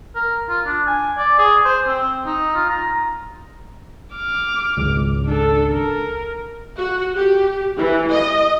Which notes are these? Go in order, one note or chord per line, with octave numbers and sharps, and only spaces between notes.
A#4
F4
D4
G#5
D5
G#4
C5
C4
D#4
F4
A#5
D6 F6
G#1 C#2
D4 A4
A#4
F#4
G4
E3
D#5